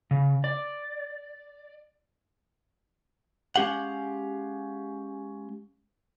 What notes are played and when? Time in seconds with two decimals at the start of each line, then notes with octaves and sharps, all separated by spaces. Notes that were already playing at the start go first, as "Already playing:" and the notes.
0.11 C#3
0.44 D5
3.56 G#3 C#4 G4 F5 F#5